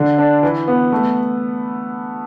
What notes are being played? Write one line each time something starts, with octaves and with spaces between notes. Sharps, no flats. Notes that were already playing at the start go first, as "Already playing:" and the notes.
Already playing: D3
D4
E3
B3
A3